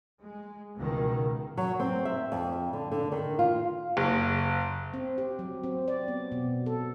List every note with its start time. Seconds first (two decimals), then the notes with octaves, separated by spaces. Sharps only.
0.20 G#3
0.78 C#2 B2 D#3
1.57 F#3
1.80 C4
2.05 E5
2.32 F2
2.73 D3
2.92 D3
3.12 D#3
3.39 F4
3.97 F#1
4.94 C4
5.18 G4
5.39 F#3
5.63 C4
5.88 D5
6.08 B3
6.32 B2
6.66 A4